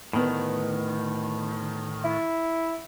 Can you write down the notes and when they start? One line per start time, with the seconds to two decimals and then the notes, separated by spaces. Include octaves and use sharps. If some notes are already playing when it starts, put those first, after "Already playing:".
0.13 D2 A2 D#3 B3 B4
2.04 E4